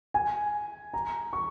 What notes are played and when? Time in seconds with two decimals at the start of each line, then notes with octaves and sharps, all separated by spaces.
0.14 G#5
0.94 A#5
1.33 C#6